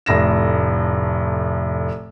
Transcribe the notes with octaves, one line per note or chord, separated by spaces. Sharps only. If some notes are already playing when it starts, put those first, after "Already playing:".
F1 A2 A#6 E7